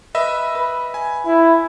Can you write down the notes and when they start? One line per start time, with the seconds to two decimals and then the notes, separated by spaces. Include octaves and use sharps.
0.15 B4 D#5 E5 E6
0.55 B4
0.94 G#5
1.26 E4